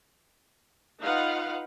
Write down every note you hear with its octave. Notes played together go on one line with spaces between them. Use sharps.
D#4 F4 B4 F5 F#5